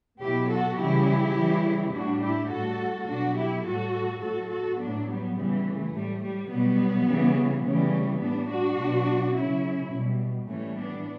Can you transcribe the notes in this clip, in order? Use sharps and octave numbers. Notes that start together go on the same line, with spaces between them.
B2 F#3 E4 G4
F#4 A4
C#3 E3 G3 E4 G4
C#3 E3 G3
A2 G3 D4 F#4
E4 G4
A2 G3 F#4 A4
B2 F#3 D4 F#4
E4 G4
A2 G3 F#4 A4
A2 F#3 F#4 A4
F#4 A4
A2 F#3 B3 D4
G3 B3
C#3 E3 G3
A3
A2 G3
G3
B2 F#3 G3 B3
C#3 E3 G3
C#3 E3 G3 A3 C#4
A2 G3 B3 D4
D4 F#4
B2 F#3
C#3 F#3 C#4 E4
B2 G3
A2 E3 G3 A3 C#4
B3 D4